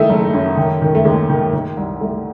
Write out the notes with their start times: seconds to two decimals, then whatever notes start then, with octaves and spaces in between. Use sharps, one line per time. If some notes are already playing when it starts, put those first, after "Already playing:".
Already playing: D#3 A3 D#4 E4
0.09 F#1
0.33 F#2
0.57 D#3
0.82 D#3
0.95 A3
1.05 D#2 G#3
1.30 D#3
1.53 D#3
1.77 C2
2.01 C2 A3